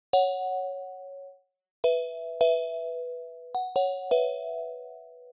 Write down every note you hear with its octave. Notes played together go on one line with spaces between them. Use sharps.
C#5 F#5
B4 E5
B4 E5
F#5
C#5 F#5
B4 E5